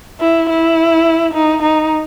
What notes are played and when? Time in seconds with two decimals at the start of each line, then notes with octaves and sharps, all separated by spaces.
0.20 E4
0.49 E4
1.34 D#4
1.63 D#4